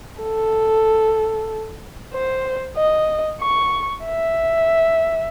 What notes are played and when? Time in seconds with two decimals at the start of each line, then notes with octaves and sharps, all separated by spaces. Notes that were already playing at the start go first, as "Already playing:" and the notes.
0.22 A4
2.14 C5
2.77 D#5
3.42 C#6
4.05 E5